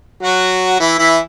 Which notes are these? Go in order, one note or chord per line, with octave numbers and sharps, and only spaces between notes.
F#3 F#4
E3 E4
E3 E4